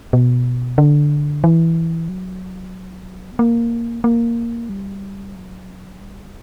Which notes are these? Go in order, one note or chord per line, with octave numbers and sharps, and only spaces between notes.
B2
D3
E3
F#3
B3
A#3
A#3
G3
F#3
G3